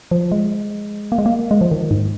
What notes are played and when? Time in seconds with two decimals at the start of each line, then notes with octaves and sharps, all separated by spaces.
0.11 F3
0.32 G#3
1.12 A#3
1.18 G#3
1.26 A#3
1.51 G#3
1.61 F3
1.72 D#3
1.91 G#2